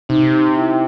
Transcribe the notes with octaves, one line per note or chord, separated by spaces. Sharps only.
C3 D#4
E4